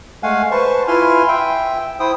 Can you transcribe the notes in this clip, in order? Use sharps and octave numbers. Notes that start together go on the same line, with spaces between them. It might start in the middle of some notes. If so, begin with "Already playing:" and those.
G#3 A3 F5 F#5 G#5
B4 C5 A5 C#6
E4 F4 B4 G#5 C6 F6
E5 G5
E4 C5 G5 D#6